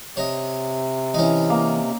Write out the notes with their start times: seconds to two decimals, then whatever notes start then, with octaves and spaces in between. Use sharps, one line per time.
0.17 C3 C#5 D#5
1.14 E3 C#4 D#4
1.50 A#3